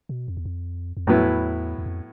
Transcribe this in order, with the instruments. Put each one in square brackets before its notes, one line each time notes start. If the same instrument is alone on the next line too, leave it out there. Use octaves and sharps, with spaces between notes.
[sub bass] B2
F2
E2
F2
F2
[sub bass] E2 [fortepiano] A2 F#3 B3 E4
[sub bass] E2
F2